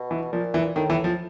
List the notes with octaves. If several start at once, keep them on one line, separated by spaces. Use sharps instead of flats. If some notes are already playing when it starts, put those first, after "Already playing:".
Already playing: B2
E3
A#2 F3
E3
A2 D#3
E3
F3